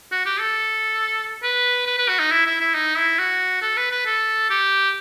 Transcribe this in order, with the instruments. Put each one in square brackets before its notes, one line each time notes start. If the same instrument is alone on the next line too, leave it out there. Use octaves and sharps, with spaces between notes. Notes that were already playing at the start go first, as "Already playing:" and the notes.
[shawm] F#4
G4
A4
B4
B4
B4
F#4
D#4
E4
E4
E4
D#4
E4
F#4
A4
B4
B4
A4
G4